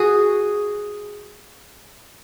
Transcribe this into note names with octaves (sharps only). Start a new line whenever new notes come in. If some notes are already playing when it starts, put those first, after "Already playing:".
Already playing: F#4 G#4